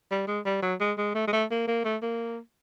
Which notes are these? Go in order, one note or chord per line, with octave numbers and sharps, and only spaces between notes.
G3
G#3
G3
F#3
G#3
G#3
A3
G#3
A3
A#3
A#3
A3
A#3